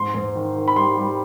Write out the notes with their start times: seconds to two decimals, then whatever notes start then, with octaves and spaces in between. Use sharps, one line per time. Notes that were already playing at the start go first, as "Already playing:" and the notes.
Already playing: G#2 C6
0.14 G#2
0.35 D#3
0.56 D#3
0.68 B5
0.76 G3 C6
0.97 G3